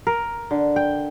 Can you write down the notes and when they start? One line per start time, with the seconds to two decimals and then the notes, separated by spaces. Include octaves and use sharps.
0.07 A#4
0.51 D3
0.76 G5